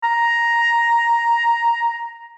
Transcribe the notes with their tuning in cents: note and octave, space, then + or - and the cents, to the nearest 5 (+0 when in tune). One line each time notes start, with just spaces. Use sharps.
A#5 +5